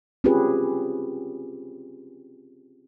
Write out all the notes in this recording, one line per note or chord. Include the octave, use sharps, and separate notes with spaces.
C4 C#4 F4 G4 G#4 B4